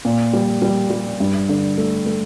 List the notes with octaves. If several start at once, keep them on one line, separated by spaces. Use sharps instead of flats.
A#2
G3
G3
G3
G2
D3
A3
A3